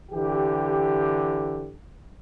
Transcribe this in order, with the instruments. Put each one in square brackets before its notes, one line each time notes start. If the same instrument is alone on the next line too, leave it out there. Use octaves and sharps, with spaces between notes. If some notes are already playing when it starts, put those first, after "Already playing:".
[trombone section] D3 E3 G4